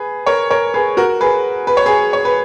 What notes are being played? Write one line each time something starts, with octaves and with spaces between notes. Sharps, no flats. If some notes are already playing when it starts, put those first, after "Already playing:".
Already playing: G#4 B4
A#4 C#5
A#4 C#5
G#4 B4
F#4 A#4
G#4 B4
B4
C#5
G#4 B4
C#5
B4